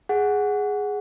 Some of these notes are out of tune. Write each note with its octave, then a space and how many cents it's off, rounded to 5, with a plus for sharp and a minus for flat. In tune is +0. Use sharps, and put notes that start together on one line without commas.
G#4 +0 F#5 +0